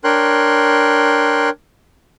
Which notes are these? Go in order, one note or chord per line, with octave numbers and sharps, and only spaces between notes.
D4 A#4 C#5 G5 C6 F#6